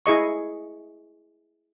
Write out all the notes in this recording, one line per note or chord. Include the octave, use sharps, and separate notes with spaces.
E4 G#4 D#5 C#6